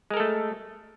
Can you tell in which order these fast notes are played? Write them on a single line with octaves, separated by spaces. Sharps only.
G#3 A#4 A4 A3